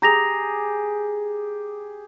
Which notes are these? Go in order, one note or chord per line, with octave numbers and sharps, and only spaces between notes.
G4 G#4 A#5 A#6 F7